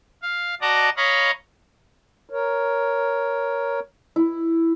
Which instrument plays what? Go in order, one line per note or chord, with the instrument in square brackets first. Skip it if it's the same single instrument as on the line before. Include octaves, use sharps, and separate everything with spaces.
[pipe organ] F5
F#4 D5 D#5 A5 A#5
C#5 D#5 F5 A#5 B5
[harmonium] A#4 C#5
[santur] E4